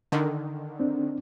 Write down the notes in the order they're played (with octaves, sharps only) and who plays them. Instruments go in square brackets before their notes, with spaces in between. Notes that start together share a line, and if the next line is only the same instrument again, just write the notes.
[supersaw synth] D3 D#3
[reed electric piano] C4 D4